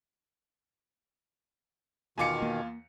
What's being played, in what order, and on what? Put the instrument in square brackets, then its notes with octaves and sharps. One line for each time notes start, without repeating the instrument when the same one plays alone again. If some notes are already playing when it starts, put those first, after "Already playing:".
[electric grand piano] E2 F4 F5 [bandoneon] B2 D#3 [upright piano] G#5 D6 C#7
[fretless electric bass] A#3